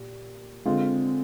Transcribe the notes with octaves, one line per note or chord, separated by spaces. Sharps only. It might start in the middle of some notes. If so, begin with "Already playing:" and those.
Already playing: A#2 G4
D3 G#3 C4 F4